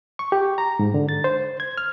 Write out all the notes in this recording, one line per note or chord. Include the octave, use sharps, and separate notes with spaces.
C#6
G4
A#5
G#2
D3
A6
C5
G#6
F6